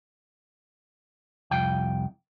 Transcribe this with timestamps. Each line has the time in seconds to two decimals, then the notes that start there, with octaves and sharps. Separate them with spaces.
1.51 C2 F2 G5